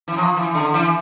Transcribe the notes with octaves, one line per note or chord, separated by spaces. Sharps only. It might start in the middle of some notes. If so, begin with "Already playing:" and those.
E3
F3
E3
D3
E3